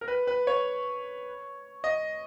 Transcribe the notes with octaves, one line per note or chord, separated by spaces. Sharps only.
A#4
B4
B4
C#5
D#5